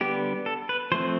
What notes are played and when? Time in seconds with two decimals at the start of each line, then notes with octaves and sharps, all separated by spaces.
0.01 D3 G3 B3 G4
0.46 A4
0.69 B4
0.92 F3 A3 C4 C5